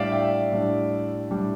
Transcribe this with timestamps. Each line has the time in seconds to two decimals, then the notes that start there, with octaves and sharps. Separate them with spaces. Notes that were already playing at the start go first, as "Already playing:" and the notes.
Already playing: A2 G3 D4 D5 E5 F5 G5
0.12 E5 G5
0.52 A2 G3 D4
1.30 A2 G3 D4